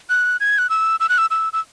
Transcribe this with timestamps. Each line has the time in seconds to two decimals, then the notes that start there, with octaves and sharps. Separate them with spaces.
0.10 F#6
0.40 G#6
0.58 F#6
0.70 E6
1.00 E6
1.09 F#6
1.18 E6
1.30 E6
1.53 E6